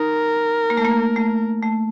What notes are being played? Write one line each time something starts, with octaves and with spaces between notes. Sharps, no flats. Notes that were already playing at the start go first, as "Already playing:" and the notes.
Already playing: D#4 A#4
A#3
A3
A#3
A3
A3